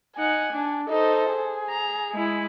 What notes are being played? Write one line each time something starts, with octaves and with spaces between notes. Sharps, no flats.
D#4 F#5 G#5
D4
D#4 A4 C5
G#4
A#5
G#3 E4